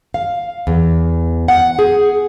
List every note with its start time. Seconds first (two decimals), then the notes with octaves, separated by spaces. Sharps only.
0.14 F5
0.67 E2
1.48 F#5
1.79 G#4